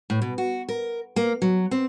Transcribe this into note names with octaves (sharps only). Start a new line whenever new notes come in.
A2
B2
F#4
A#4
A#3
F#3
C4